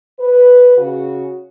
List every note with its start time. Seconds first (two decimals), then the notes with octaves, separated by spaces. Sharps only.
0.19 B4
0.77 C#3 F#4